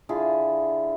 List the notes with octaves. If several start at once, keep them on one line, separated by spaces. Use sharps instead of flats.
D3 E4 F4 G#4